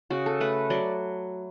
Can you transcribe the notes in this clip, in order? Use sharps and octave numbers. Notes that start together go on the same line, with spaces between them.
C#3 F#4
A4
A3 B4
F#3 D5